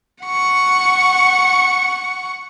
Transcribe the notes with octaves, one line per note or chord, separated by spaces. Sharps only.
F#5 C#6